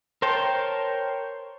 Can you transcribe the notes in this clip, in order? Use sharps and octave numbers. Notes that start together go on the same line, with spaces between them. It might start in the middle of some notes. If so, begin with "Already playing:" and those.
A#4 C5 C#5 G5 A5